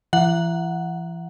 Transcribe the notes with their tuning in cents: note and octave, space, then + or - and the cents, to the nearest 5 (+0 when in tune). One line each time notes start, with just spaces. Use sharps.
E3 +35 F#5 +0